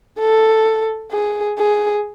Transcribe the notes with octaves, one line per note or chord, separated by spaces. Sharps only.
A4
G#4
G#4